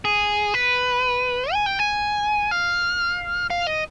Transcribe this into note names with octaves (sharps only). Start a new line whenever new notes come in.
G#4
B4
G#5
G5
G#5
F5
F5
D#5